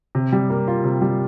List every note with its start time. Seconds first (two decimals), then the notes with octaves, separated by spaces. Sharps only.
0.15 C3
0.33 G3
0.50 A#3
0.68 F4
0.84 C3
1.02 G3